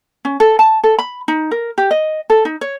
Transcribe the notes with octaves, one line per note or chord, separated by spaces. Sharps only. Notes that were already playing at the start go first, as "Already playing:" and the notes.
C#4
A4
A5
A4
B5
D#4
A#4
G4
D#5
A4
D#4
C#5